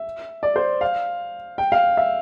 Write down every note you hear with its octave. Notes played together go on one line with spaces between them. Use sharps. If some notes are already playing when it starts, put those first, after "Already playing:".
Already playing: E5
D5
C5
F5
G5
F5
E5